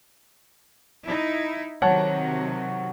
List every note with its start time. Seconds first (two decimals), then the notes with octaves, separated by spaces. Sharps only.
1.04 D#4 E4
1.82 C3 D#3 F#3 C#5 F#5 A5